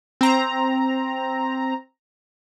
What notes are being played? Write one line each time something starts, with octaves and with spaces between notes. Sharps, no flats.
C4 A#5